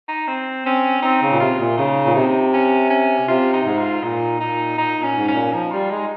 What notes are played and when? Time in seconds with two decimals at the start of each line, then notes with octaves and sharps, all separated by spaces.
0.08 D#4
0.28 C4
0.65 C4 C#4
1.02 C4 D#4
1.22 C#3
1.32 A#2
1.40 C3 F4
1.59 A#2
1.77 C#3 D#4
2.06 A#2
2.15 C3
2.53 C#4
2.90 C#4
3.27 C3 F4
3.53 D#4
3.66 G#2
3.78 F4
4.03 A#2 D#4
4.40 A#2 D#4
4.78 A#2 D#4
4.97 A#2
5.03 C#4
5.16 G#2
5.29 C#4
5.34 A#2
5.53 F3 D#4
5.72 G3 F4
5.90 G#3 D#4